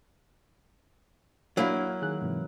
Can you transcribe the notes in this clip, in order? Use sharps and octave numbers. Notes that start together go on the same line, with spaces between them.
F#3 A#3 D4 E4 F5
D#3 G#4 F#6
G#2 C3 E3